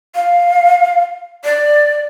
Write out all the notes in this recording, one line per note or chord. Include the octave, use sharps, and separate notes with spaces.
F5
D5